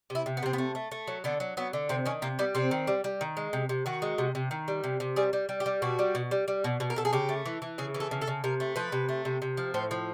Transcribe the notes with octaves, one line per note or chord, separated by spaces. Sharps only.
C3
E4
C3
B3
C3 C4
B3
A3
A3
A3
F#3
D3 B3
F#3
F#3 B3
D3
C3 C4
D#3 C#4
C3 A#3
G3 B3
C3 C4
D#3
G3
G3
D#3
G#3
C3
C3
D#3 F#4
G#3
C3
C3
D#3
G3
C3
C3
G3 G#4
G3
G3
G4
G3
B2 F#4
G3
B2
G3
G3
B2
B2
A#4
B2 A4
G#4
C#3 G4
A3
E3
E3
C#3 G#4
E3
A4
C#3
A4
C#3
C3 A#4
A3
F3 B4
C3
A3
C3
C3
F3
A2 C5
F3